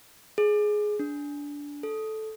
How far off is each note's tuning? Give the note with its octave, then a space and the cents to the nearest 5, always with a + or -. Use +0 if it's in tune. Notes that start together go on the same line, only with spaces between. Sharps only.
G#4 +10
D4 -15
A4 -10